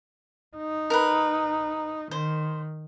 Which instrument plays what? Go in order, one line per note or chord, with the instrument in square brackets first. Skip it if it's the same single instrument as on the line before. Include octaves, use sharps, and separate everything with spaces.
[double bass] D#4
[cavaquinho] A#4 B4
[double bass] D#3 [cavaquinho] C5